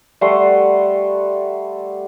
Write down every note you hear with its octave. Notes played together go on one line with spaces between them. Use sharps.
G3 A3 F#5 C6